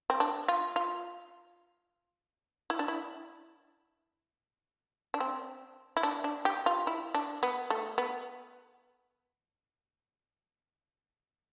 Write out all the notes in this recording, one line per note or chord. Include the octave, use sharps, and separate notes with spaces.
C4
D4
F4
F4
E4
D4
E4
D4
C4
E4
D4
D4
G4
F4
E4
D4
B3
A3
B3